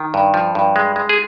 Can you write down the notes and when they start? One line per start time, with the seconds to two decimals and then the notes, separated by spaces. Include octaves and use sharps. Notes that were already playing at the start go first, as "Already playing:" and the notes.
Already playing: D#3
0.14 G2
0.34 F3
0.55 G2
0.76 G#3
0.96 G#3
1.09 G#4